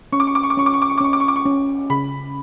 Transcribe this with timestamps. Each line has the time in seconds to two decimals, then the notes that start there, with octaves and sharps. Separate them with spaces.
0.12 C#4 C#6
0.20 D6
0.27 C#6
0.35 D6
0.43 C#6
0.50 D6
0.57 C#4 C#6
0.66 D6
0.73 C#6
0.82 D6
0.89 C#6
0.98 D6
1.00 C#4 C#6
1.13 D6
1.20 C#6
1.28 D6
1.36 C#6
1.46 C#4
1.90 C#3 B5